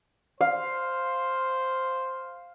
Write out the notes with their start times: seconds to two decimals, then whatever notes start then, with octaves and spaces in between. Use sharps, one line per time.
0.41 C5 F5